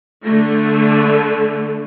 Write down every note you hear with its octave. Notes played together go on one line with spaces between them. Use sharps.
D3 A3